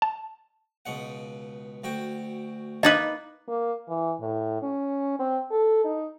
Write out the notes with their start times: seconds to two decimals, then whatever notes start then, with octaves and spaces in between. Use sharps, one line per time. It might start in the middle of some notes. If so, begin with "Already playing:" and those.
0.02 A5
0.86 C#2 B2 F#5
1.84 D2 F#4 G5
2.83 A#3 D#4 B4 D#5 D6
3.48 A#3
3.88 E3
4.21 A2
4.63 C#4
5.19 C4
5.50 A4
5.85 D#4